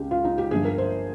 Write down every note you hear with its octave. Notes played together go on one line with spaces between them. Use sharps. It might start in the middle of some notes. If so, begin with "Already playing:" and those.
Already playing: C#2 C#3 G#3 G4
F4
D#4
G4
G1 G2 F3 G#3 G#4
A#4
C5